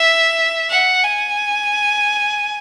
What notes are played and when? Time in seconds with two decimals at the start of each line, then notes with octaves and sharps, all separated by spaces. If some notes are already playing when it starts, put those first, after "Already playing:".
Already playing: E5
0.71 F#5
1.04 G#5